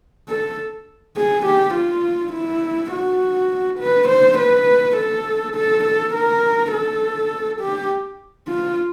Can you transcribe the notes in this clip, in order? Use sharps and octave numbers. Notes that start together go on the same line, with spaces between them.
A4
G#4
G4
F4
E4
F#4
B4
C5
B4
A4
A4
A4
A#4
A4
G4
F4